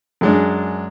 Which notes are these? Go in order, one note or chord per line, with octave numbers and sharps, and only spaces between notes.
F#2 G#3 D4